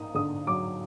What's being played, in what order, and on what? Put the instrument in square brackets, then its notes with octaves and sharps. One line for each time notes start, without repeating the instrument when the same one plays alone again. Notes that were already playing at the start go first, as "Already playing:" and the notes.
Already playing: [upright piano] A#3 D#4 D#6
D3 D#6
F#3 D6